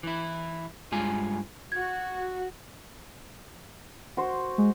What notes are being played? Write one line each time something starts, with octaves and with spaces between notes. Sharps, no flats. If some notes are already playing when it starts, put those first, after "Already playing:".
E3 E4
G2 G#3 F4 G#5
F#4 G#6
F#4 C5
G#3